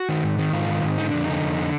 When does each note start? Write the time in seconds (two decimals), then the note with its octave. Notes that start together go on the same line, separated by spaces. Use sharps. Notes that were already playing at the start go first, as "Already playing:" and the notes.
Already playing: F#4
0.09 D#3
0.23 G#2
0.38 D#3
0.53 G#2 F4
0.68 D#3
0.83 G#2
0.98 D3 D#4
1.10 F2 D4
1.24 D3 D#4
1.42 F2
1.58 D3